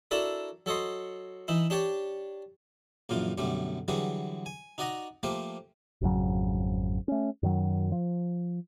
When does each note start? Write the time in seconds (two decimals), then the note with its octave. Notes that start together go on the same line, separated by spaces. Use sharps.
0.11 D4 E4 F#4 A4 A#4 D5
0.66 F#3 A4 C#5 D#5 C6
1.48 E3 D#4 E4
1.70 D4 G4 C#5 D5
3.09 A#1 F#2 A#2 E3 F4
3.38 B1 F#2 D3 G3 A3
3.88 D3 E3 F#3 G3 G#4 B4
4.46 G#5
4.78 D#4 F#4 D5 D#5 F#5 A#5
5.23 F3 A3 A#3 G4 C5
6.01 G#1 F2 C#3 F#3
7.08 A3 C#4
7.43 F#2 D#3 F#3
7.92 F3